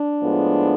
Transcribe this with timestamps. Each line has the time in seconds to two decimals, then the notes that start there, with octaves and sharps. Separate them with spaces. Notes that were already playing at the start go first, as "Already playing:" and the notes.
Already playing: D4
0.22 A2 F3 G#3 B3